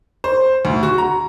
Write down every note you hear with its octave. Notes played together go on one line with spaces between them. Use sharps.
C5
D2
F#4
A#5